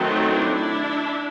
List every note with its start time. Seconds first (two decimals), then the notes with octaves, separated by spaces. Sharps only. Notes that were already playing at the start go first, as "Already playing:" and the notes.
Already playing: D#3 F#3 A3 C4
0.28 D4 E4